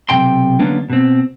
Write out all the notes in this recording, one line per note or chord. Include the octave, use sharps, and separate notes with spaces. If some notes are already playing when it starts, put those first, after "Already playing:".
B1 F#2 C3 G5 C6
D3 F#3 A#3 B3 C#4 D4
B2 C4